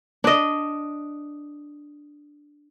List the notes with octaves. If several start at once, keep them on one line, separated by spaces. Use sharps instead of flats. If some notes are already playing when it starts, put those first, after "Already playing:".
D4 D#5